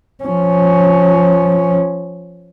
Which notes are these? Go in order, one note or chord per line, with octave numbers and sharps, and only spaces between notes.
F3 C#4